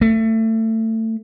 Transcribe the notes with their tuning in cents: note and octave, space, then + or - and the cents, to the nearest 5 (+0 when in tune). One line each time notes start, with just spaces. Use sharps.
A3 +25